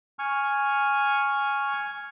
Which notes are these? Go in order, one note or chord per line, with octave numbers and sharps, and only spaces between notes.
G#5 C#6 F6